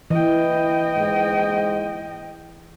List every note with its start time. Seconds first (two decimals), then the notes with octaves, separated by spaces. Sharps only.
0.10 E3 D#5 G5
0.97 G#2